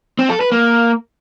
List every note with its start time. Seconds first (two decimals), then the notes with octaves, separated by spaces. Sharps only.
0.19 C4
0.30 A4
0.41 B4
0.52 A#3